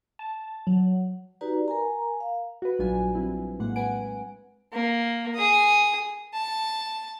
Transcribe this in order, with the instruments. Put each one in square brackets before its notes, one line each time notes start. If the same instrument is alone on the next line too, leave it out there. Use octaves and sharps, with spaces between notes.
[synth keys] A5
F#3
[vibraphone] D#4 F#4 G4 B4 D5 A#5
A#4 G#5 A#5
F5
[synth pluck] F#4 B4
A#1 F#3 G3 D4 F4 G#5
G3 C4 E4
A2 G#3 A#3 F#5
B4 F#5 G#5 D7
[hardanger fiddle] A#3
G#4 D#6
A5